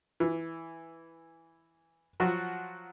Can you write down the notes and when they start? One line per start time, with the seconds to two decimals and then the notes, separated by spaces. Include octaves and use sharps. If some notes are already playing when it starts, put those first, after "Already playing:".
0.20 E3
2.20 F3 F#3 F#4